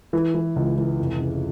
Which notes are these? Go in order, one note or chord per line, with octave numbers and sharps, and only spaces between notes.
E3
E3
C#2
E3
F1
C#3